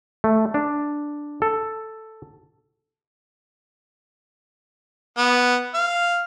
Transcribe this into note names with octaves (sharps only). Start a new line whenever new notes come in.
A3
D4
A4
B3
F5